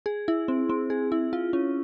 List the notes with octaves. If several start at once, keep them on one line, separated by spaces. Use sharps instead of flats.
G#4
E4
C4
C4
G#4
E4
F4
C#4